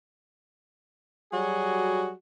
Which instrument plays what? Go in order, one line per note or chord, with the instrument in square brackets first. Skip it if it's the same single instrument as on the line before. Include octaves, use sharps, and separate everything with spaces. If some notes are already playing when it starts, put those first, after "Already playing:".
[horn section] F#3 G3 F#4 G#4